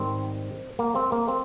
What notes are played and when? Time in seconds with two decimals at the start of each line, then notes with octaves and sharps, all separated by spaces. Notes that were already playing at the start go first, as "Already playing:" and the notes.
Already playing: G#2 D#3 G3 C4
0.79 A#3
0.95 C4
1.12 A#3
1.28 C4